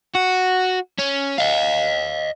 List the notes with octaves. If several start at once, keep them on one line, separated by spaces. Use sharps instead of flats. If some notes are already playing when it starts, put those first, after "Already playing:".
F#4
C#4
D#5 F5